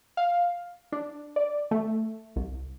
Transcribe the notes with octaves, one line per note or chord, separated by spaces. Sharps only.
F5
D4
D5
A3
C2